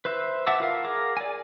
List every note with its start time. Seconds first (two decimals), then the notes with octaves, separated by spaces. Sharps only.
0.05 B4 C5 E5
0.47 E5 F#5 A5 D6 E6
0.60 F4 A#4 F5
0.84 G#4 A#4 D6
1.17 D5 G#5